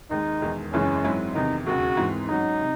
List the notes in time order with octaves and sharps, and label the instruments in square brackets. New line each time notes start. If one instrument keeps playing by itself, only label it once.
[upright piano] D#2 D#3 G#3 [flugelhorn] D#4
[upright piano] E1 E2 D#3 G#3
[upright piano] F#1 F#2 E3 G#3 [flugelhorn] C#4
[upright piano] G#2 F#3 C4 E4
[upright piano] E2 C3 D#3 [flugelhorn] D#4
[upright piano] E1 D#2 C#3 [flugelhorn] F#4
[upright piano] G#2 E3 C4
[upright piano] G#2 F#3 C#4 F#4 [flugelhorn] D#4
[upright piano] C3